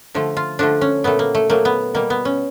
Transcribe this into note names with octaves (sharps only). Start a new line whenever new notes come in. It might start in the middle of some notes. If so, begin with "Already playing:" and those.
D3 F3 A3
F4
D3 F3 A3 D4
C#4
A#2 F#3 A3 B3
A#3
A3
A#2 F#3 A3 A#3
B3
B2 G3 A#3
B3
C#4